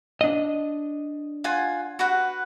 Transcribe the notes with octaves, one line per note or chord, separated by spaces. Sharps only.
D4 D#5
F4 F#5 G#5
F#4 B4 F#5